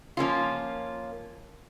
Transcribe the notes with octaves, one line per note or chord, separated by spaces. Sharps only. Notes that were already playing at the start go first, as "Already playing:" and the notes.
F3 A#3 C#4 F4